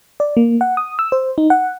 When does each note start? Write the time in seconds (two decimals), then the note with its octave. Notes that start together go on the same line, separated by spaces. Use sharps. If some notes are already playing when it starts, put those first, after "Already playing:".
0.20 D5
0.37 A#3
0.61 F#5
0.77 D#6
0.99 E6
1.12 C5
1.38 D#4
1.50 F#5